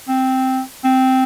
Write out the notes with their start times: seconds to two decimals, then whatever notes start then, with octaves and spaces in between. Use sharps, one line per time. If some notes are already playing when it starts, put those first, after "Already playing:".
0.08 C4
0.84 C4